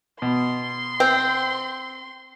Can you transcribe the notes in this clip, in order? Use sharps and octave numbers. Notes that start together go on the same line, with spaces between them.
B2 C6
C4 G5